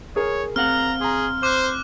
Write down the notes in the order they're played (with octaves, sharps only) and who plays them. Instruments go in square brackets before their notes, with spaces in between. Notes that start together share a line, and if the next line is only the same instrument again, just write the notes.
[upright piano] G#4 A#4 [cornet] C#5
[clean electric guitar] C4 F5 F#5 [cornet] A#5 [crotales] F6
[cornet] G#4 [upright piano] A#5 C6
[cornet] C5 [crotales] D6 F#6